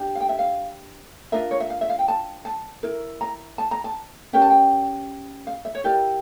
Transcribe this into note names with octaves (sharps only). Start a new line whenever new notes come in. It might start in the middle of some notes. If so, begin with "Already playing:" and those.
Already playing: D4 G4
F5
G5
E5
F5
D4 F4 A#4 E5
C#5
E5
F5
E5
F5
G5
A5
A5
E4 A#4
A#5
A5
A#5
A5
C#4 G4 A#4 G5
A5
G5
F5
E5
C#5
E4 G4 A#4 D5